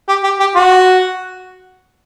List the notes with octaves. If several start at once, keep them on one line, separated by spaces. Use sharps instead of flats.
G4
G4
G4
F#4